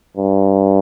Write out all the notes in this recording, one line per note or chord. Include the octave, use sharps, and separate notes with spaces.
G2